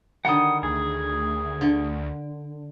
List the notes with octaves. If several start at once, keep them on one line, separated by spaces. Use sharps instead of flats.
D3 D#3 G3 F#5 D#6
D2 G#4
D3